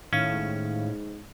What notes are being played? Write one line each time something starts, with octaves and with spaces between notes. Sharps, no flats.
A2 D#3 C#4 F5
G#2